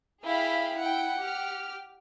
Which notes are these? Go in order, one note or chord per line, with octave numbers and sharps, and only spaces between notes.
E4 G#4 F5 G5 B5
E4 F#5 G5
G4 F6